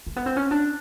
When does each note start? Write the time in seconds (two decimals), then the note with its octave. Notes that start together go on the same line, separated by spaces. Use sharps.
0.07 A#3
0.16 B3
0.26 C4
0.36 C#4
0.51 D4